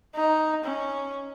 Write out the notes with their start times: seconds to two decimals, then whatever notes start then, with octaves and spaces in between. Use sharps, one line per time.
0.15 D#4
0.64 C#4